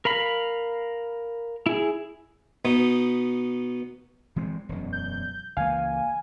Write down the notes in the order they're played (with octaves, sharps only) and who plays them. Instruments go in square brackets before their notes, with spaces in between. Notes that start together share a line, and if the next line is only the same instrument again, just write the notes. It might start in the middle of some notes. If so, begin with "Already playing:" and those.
[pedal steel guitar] A#4 F5 B5
E4 G#4
[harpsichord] B2 B3 D#4
[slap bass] E3 G#3 C4
E1 F#2
[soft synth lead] G6
[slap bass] C#2 E3 A#3 [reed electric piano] F5 [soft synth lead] G#5